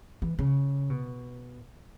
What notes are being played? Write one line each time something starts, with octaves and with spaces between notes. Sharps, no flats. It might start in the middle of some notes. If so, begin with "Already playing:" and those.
E3
C#3
B2